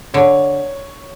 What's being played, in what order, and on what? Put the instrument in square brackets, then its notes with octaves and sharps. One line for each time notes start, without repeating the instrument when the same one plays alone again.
[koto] D3 [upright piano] C#5